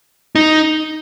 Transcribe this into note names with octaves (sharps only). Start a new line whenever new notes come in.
D#4